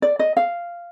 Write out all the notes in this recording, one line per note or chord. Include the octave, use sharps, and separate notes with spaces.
D5
D#5
F5